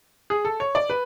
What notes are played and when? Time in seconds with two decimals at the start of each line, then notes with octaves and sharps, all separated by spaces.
0.30 G#4
0.45 A4
0.60 C#5
0.75 D5
0.90 B4